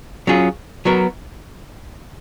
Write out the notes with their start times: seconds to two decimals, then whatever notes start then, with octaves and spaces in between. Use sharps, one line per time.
0.27 F#3 C#4 F4 G#4
0.85 F#3 B3 F#4 A#4